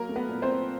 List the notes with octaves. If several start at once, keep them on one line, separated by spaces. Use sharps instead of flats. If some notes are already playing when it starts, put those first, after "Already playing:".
Already playing: F#3 A#3 A#4
A3
B3 B4
A#2
C4 C5
A#2